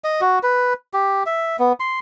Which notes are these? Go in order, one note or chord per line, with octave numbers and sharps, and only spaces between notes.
D#5
F#4
B4
G4
E5
B3
C6